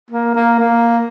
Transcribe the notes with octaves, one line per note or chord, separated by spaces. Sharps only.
A#3
A#3
A#3